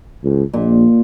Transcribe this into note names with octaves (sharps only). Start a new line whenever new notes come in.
C#2
A#1 A#2